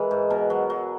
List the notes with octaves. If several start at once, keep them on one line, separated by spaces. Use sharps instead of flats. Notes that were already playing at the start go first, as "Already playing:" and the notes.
Already playing: E3 G#3 G#4 A#4
G#2
B2 A#4
F#3
F#3